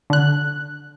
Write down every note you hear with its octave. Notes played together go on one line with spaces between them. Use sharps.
D3 F#6